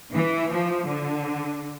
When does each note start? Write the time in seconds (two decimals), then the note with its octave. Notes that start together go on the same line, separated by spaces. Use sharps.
0.13 E3
0.49 F3
0.86 D3